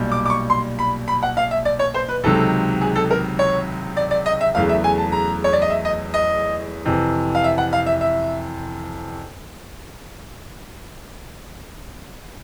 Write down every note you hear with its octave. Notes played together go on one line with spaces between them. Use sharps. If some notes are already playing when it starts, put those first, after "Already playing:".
Already playing: B1 A#2 G3
D6
D6
C#6
C6
B5
B5
F#5
F5
E5
D5
C#5
C5
B4
C#2 C3 D#3 F#3 A4
G#4
A4
A#4
C#5
D5
D5
D#5
E5
E2 C#3 F#3 A3 F5
E5
G#5
A5
A#5
C#5
D5
D#5
E5
D#5
D#5
F2 C3 E3
F5
E5
F#5
F5
E5
E5